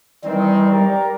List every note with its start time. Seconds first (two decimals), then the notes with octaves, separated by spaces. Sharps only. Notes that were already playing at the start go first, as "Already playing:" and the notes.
0.24 D#3 E3 G3 C4
0.72 G4 A#4 D5